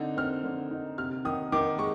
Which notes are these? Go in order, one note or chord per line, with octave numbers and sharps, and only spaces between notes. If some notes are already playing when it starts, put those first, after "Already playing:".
Already playing: D3 C4 D#4
C4 F6
D3
D#4
C3 F6
D#3 D#6
D#3 D6
G#3 C#6